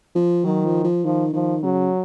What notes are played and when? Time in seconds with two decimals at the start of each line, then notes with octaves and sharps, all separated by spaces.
0.15 F3
0.45 D#3 F#3
0.65 F3
0.84 F3
1.04 D#3 F3
1.33 D#3 F3
1.63 C#3 F#3